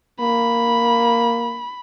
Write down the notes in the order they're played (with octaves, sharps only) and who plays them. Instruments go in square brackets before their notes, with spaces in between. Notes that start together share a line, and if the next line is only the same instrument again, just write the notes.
[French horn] A#3 [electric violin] B5